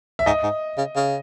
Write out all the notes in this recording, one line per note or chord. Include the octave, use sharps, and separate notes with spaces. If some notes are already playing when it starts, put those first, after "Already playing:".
E5
G#2 D#5
G#2
C#3
C#3